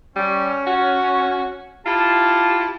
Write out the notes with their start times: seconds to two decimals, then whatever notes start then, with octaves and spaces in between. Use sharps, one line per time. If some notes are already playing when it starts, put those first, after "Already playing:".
0.16 G3 C#4
0.67 F#4
1.86 E4 F4 G4 A5